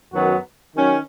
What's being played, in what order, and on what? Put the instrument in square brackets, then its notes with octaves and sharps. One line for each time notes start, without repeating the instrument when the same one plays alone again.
[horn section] F#2 D#3 F#3 B3 F#4
D#3 F#3 C#4